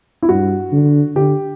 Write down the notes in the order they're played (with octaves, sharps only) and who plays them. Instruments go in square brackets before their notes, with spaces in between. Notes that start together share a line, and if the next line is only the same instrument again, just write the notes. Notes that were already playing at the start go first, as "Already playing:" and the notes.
[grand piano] E4
[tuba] G2 [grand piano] F#4
[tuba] D3
[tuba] D3 [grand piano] G4